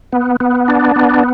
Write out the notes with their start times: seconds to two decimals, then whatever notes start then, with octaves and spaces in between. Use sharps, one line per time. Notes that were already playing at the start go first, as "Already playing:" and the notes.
0.13 B3
0.40 B3
0.68 D4
0.96 B3